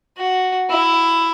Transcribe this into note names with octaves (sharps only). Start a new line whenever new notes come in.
F#4
E4